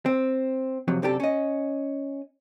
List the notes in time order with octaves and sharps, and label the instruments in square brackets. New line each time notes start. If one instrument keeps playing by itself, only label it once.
[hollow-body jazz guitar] C4
F2 C3 F#3
F#2 C3 D4 G4 A4
C#4 D#5